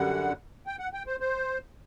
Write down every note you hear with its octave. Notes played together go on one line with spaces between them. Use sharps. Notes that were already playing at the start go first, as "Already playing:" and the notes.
Already playing: F#2 D3 G3 F#5
G5
F#5
G5
C5
C5